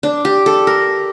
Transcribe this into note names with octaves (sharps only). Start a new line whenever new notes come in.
D4
G4
A4
A#4